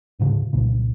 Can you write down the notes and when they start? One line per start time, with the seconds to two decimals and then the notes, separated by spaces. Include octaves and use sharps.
0.19 D1 G#2 C#3
0.53 C2 A#2 C#3